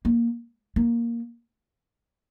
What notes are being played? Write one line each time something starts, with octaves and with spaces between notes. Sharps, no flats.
A#3
A#3